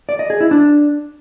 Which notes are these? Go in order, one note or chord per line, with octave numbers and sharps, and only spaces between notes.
D5
D#5
G#4
E4
D4